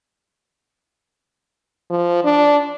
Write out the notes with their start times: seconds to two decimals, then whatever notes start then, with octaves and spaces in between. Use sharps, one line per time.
1.90 F3
2.24 D4